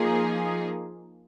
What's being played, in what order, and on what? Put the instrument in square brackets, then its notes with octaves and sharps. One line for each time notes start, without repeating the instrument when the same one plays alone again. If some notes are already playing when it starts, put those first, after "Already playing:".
Already playing: [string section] F3 A#3 D#4 G#4